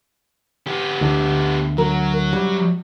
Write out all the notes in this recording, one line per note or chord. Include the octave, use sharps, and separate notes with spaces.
B3 G4
D2 D3
F#3 A#4
F#2 G3